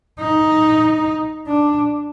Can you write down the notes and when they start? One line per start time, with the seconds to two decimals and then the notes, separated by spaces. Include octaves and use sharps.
0.20 D#4
1.47 D4